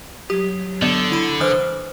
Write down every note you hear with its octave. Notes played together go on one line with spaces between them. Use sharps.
F#3 G4 D#6
D3 B3 D5
E4 B5
E3 B4 C5 D#6 F6